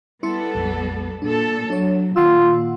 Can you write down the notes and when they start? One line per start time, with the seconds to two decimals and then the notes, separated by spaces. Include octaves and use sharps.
0.23 G3 B3 E4 A4 C6 C#7
0.55 A#1 F2
1.22 A#2 D4 A4
1.70 F#3 D4 C#5
2.16 A#2 D#3 F4 F#5 E6